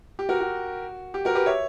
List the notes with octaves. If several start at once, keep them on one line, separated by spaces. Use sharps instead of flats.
G4
F#4 A#4
F#4
G4
F#4 A#4
G4 B4
C#5 E5